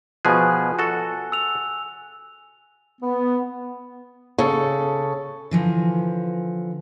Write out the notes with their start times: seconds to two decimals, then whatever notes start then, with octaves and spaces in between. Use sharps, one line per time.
0.25 B2 F3 G#4 G#5 F#6
0.79 F#4 A4
1.32 E6 F7
3.02 B3
4.38 C#3 A4
5.51 D3 E3 F3